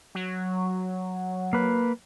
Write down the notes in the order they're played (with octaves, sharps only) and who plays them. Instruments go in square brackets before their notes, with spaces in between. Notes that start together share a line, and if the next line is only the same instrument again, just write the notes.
[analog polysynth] F#3
[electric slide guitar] A#3 B4